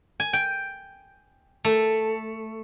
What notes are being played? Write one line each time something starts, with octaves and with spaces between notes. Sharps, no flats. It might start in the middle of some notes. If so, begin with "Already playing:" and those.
G#5
G5
A3